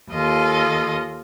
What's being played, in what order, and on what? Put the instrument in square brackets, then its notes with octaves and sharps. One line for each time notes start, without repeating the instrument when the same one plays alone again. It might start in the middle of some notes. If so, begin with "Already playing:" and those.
[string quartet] D#2 F4 A4 D#5